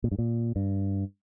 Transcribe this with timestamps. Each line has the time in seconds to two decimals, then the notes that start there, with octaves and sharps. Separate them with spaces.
0.04 A#2
0.12 G2
0.19 A#2
0.56 G2